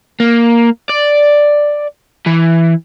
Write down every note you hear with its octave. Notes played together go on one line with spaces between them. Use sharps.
A#3
D5
E3